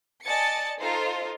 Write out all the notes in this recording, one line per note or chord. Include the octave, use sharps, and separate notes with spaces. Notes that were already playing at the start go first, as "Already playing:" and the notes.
D5 D#5 G#5 A5 A6 C#7
D#4 F4 A4 C5